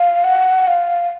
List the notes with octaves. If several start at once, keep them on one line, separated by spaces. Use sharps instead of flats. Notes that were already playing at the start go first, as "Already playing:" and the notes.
Already playing: F5
F#5
F5